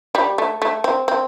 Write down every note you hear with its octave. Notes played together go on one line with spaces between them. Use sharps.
G3
A3
A3
C4
C4